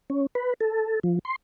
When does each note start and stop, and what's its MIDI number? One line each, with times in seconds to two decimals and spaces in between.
0.10 0.26 61
0.35 0.54 71
0.61 0.99 69
1.03 1.19 53
1.25 1.36 84